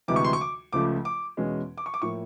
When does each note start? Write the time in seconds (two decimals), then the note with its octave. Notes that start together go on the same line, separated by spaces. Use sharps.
0.08 D2 C3 E3 G#3 D6
0.16 C#6
0.24 C6
0.33 C#6
0.41 D6
0.73 C#2 C#3 F3 A3 D6
1.05 D6
1.37 E2 B2 G#3 C#4
1.78 D6
1.86 C#6
1.94 D6
2.02 A2 F3 A#3 C#6